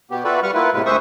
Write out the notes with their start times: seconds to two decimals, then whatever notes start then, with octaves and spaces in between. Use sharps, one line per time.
0.11 B2 B3 G4
0.24 F4 F#4 A4 B4 D5 E5
0.43 G3 B4 F#5 C#6 F6
0.54 A#3 E4 F4 B4
0.74 A2 C3 G#3 B4
0.86 D2 G#3 C5 E5 C#6 D#6